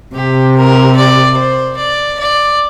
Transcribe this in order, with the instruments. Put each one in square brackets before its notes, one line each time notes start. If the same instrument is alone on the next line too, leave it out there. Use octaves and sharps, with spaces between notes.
[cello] C3 [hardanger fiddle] G4
[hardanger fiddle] A#4
D5
C5
D5
D5